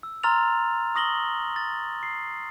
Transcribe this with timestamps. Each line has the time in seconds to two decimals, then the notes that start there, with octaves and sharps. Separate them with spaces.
0.03 E6
0.23 A#5 C6 E6 F6 A6 F7
0.95 C#6 D#6 A#6 F#7 G7
1.56 A6
2.03 C7